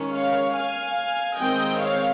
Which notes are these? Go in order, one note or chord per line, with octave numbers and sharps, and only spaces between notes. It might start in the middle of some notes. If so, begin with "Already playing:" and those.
Already playing: D#3 G#3 C#4
C#5 F5
F5 G#5
D#3 G#3 C4 D#5 G5
C#5 F5